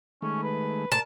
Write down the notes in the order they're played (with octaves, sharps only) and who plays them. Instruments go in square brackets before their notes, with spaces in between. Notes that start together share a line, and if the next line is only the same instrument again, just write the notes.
[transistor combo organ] D#3 G#3 A3 [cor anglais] C#4
[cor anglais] B4
[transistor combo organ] A2 C5 [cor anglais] A#4 [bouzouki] A5